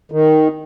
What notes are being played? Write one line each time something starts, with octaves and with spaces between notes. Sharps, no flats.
D#3